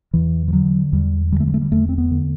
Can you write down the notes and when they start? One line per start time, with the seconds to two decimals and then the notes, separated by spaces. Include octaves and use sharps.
0.13 E2 E3
0.48 E3
0.53 D3 F#3
0.92 E2 G3
1.32 D3 G3
1.40 A3
1.47 G3
1.54 A3
1.61 G3
1.72 E2 A3
1.89 C4
1.98 B3
2.11 D3